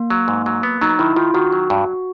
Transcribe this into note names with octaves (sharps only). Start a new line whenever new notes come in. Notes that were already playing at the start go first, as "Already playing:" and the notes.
Already playing: A#3
F#3
G#2
F#3
B3
F#3 D#4
D#3 E4
D#3 F4
D#3 F#4
F#3
G2